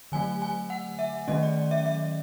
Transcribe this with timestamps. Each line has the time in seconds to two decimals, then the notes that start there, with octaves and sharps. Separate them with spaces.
0.12 D3 F#3 A3 G#5
0.42 G#5
0.70 F#5
0.99 E5
1.28 D#3 F#3 A3 C#4 D#5
1.43 D5
1.71 E5
1.86 E5